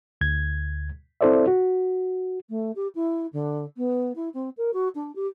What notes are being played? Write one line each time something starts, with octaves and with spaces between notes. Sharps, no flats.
D2 G#6
C4 E4 A4 C5 D5 E5
F#4
A3
G4
E4
D3
B3
E4
C4
A#4
F#4
D4
G4